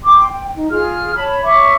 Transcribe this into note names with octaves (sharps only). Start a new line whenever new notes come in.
G5 C6 D6
G5
D#4
F4 G#4 F6
C#5 A5 B5
C#5 E5 C#6 D6